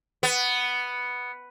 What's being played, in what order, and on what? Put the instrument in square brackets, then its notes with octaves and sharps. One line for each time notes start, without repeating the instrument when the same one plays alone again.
[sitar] B3